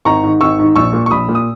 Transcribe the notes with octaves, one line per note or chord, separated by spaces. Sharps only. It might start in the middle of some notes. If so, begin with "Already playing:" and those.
G#1 A#5 C#6
G#2 D#3
G#1 C#6 E6
G#2 D#3
A#1 C#6 E6
A#2
C#6
A#1 B5 D#6
A#2
D#6